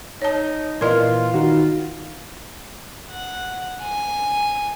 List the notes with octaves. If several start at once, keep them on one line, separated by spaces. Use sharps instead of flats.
D#4 C#5 A5
A#2 E3 F4 A#4 D5 D#5 C6 F6
D#3 D#4 F#4
F#5
G#5